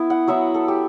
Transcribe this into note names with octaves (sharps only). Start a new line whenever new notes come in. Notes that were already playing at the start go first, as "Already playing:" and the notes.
Already playing: B3 E4
F#5
F#3 B3 E4 E5
A4
G4